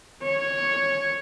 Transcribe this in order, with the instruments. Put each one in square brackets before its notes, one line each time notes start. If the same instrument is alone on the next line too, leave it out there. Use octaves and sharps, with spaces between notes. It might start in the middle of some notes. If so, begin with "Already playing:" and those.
[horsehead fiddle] C#5